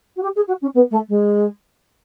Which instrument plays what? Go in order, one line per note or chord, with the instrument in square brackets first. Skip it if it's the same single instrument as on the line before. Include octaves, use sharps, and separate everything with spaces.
[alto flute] F#4
G4
G#4
F#4
C#4
B3
A3
G#3